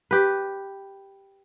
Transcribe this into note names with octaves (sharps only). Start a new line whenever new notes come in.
G4 B4